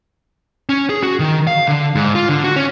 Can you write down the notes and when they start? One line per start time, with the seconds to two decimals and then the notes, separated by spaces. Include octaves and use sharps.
0.69 C#4
0.89 G#4
1.03 F#4
1.20 D#3
1.47 F5
1.68 D3
1.95 G#2
2.15 F4
2.29 D3
2.44 F#4
2.56 C#4